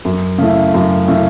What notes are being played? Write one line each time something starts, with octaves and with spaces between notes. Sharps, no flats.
F#2
C#3 A3 E4
F#2
C#3 A3 E4